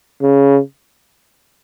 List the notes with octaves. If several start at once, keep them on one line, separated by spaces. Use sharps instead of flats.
C#3